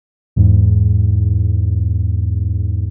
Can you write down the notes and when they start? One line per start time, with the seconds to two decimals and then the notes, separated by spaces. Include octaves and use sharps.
0.36 E2 G#2